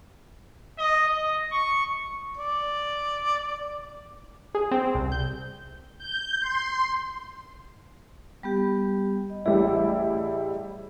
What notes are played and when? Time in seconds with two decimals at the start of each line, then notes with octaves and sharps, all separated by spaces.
0.78 D#5
1.08 D#5
1.52 C#6
2.37 D5
4.55 G#4
4.71 C4
4.95 C2
5.12 G6
5.98 G6
6.40 C6
8.43 G3 B3 G4
9.30 D#5
9.46 A1 G3 E4 G#4